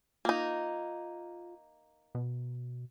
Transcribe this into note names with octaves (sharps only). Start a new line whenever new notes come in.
A#3 D#4 F4
B2